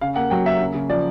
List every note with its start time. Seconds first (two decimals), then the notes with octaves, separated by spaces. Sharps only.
0.01 C#3 F5
0.16 A#3 F#5
0.30 F#3 G5
0.45 A#3 E5
0.60 C#3
0.74 C#3
0.90 F3 D5